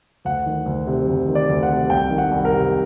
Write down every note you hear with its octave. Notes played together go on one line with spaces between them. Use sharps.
D2 F#5
D#3
D2
C3
D2
D#3
D5
D2
F#5
C3
C2 G5
D#3
F#5
C2
A#4
C3